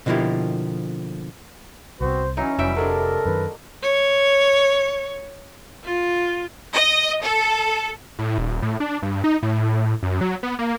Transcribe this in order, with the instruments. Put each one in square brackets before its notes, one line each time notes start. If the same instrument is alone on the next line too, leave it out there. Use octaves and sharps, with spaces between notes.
[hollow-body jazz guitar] B2 D3 F3 A#3 E4 G4
[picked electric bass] C2 C3 [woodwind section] B3 C4 F#4 [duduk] C5
[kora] E3 D#4 [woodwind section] F#3 [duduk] C#4
[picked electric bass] F1 [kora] E3 E5 G5 [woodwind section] F#3 G3
[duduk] C3 [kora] F#3 G#3 D4 [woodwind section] A4 A#4
[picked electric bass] F#2 D#3 [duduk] B4
[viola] C#5
F4
[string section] D#5
A4
[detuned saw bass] A2
D#1
A2
D4
G2
D#4
A2
F#2
F#3
B3
A#3